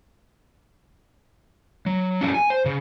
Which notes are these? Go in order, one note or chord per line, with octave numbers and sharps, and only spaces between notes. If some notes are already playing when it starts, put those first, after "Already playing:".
F#3
C#4 D4 F4 G4 A4
G#5
C5
C#3